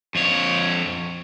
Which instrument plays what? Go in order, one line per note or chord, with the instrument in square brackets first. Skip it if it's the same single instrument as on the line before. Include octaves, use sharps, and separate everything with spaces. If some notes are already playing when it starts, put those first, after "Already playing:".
[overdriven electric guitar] F2 C#5